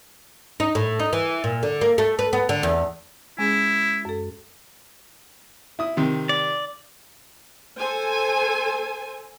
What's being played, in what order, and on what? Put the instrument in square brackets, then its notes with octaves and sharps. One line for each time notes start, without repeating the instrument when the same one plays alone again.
[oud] D#4
A2
D#4
E3
A#2
D3
A#3
A3
B4
B3
D3
E2
[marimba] G#3 C#4 G#4 [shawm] E4
[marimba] F#2 A4
[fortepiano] E4 D#6
C3 D#3
[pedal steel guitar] D5
[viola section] A4 C5 G#5